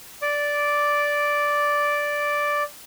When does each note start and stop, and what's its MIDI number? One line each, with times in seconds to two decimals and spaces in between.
0.22 2.63 74
0.22 2.63 86